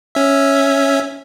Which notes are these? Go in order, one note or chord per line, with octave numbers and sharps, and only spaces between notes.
C#4 E5